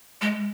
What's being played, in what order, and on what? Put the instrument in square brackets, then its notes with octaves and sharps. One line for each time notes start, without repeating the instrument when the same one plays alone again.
[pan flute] G#3